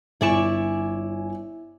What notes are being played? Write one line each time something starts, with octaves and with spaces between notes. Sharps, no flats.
G1 E4 D5 G#5 C#6 E7